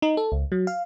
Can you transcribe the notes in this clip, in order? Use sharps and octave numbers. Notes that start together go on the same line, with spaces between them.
D#4
A4
C#2
F#3
F5